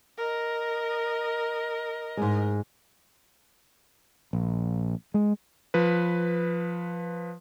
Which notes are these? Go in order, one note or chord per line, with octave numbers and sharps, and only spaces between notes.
A#4 D#5
G#2 G#3
A#1
G#3
F3 B4